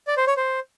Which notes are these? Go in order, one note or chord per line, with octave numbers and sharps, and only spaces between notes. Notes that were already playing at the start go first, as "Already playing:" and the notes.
D5
C5
C#5
C5